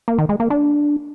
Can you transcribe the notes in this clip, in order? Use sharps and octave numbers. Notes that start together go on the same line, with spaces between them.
A#3
D#3
G#3
A#3
D4